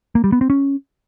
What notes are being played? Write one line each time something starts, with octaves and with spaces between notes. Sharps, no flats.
A#3
G3
B3
C4
C#4